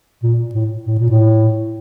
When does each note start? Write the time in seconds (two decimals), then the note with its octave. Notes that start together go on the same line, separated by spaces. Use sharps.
0.23 A#2
0.55 A2
0.86 A2
0.99 A#2
1.10 A2